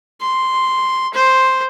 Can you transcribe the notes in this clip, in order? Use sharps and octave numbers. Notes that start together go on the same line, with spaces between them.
C6
C5